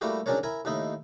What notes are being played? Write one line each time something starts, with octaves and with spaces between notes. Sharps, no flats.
G3 A3 A#3 E4 F#4 G4
G#2 F#3 C#4 D4 A#4 C#5
E4 A#4 G#5
D#2 A2 D#4 E4 D#5